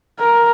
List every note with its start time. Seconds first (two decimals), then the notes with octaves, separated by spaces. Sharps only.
0.19 A#4